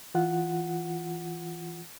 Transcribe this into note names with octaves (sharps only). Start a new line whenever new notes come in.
E3 F4 F#5